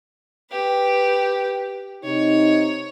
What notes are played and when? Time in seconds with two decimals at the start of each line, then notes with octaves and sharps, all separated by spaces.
0.51 G4 B4
2.04 C3 D#4 C#5